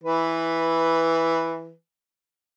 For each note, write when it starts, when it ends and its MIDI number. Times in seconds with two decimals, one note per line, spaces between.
0.04 1.72 52
0.04 1.72 71